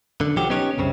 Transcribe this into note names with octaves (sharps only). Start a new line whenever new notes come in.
D3
B1 F3 F#3 F#4 G4
B3 C#4 D#4 G4 C#5
C2 F#2 C#3 C4